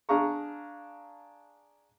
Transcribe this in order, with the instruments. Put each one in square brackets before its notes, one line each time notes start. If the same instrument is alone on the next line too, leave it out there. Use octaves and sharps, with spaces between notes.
[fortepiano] D4 G#4 F5 A#5 C#6